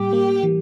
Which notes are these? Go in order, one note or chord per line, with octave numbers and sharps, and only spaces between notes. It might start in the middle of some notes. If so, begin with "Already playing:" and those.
Already playing: A2 G3 A#3 G4
A#3
E3